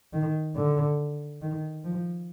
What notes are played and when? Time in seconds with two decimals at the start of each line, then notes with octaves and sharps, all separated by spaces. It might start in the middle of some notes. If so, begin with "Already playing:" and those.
0.13 D#3
0.56 D3
1.42 D#3
1.85 F3